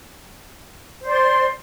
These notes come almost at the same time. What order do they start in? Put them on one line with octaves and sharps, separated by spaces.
C5 D5 C6